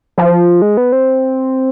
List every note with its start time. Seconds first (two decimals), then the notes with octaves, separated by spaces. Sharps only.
0.18 F3
0.62 G#3
0.77 B3
0.92 C4